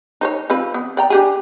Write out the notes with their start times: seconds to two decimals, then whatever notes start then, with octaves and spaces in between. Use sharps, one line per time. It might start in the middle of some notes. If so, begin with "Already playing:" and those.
0.21 D#4 C5 C#5
0.50 F3 C4 B4
0.74 B3
0.97 D5 G5 A#5
1.10 D4 G4 G#4